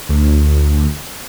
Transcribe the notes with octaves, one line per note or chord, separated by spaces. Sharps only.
D2